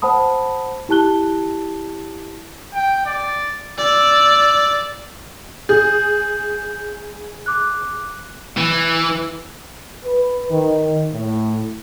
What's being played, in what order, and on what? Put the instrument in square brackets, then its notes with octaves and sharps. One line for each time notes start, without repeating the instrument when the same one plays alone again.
[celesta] C5 F#5 A5 B5 D#6
E4 G4 A5 F#6 G7
[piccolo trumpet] G5
D5
[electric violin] D5 [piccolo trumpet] E6
[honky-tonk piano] G#4 [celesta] G6
[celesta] D6 F#6
[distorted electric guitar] E3
[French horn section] B4
D#3
A2